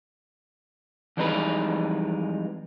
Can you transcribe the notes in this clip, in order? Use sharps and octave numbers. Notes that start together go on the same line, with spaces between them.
F2 E3 G3 G#3 D#4 B4